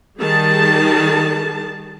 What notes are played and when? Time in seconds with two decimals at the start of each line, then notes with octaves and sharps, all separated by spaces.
0.20 D#3 G3 G#4 A5